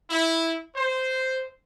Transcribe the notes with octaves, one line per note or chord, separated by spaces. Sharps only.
E4
C5